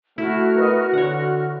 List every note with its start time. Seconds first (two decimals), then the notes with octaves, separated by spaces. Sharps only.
0.18 A3 E4 F#4 F6
0.56 A#4 B4 D#5
0.93 D3 C#5 F#5